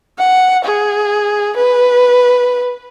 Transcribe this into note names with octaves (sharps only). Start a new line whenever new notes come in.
F#5
G#4
B4